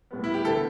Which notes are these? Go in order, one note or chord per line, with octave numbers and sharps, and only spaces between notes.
A2 G3 B3
E4
G4
D3 B3 A4